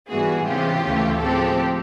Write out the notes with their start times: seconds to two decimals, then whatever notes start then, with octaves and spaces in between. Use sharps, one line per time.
0.08 G#2 E3 G3 B3 F#4 G#4
0.46 C3 E3 G#3 C#4 F4 G4
0.85 D2 C#3 E3 A3 C#4
1.22 A2 F3 G#3 C4 G4 A4